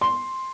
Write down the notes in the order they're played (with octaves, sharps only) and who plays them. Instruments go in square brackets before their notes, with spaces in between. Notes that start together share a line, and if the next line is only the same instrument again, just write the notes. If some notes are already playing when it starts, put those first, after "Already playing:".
[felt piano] C6